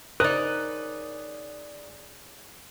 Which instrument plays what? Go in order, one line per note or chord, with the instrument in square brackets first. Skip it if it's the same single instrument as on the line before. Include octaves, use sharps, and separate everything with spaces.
[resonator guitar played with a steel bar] C#3 D#4 [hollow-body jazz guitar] A#4 C5 A#5 [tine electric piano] D5 D#6 [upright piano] F#6